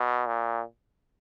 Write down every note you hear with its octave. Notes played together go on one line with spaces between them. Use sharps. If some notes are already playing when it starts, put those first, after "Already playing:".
Already playing: B2
A#2